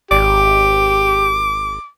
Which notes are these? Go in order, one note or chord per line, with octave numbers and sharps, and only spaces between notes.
G#1 G4 D6